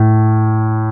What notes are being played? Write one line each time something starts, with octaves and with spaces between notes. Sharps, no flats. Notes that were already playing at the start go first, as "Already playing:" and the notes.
Already playing: A2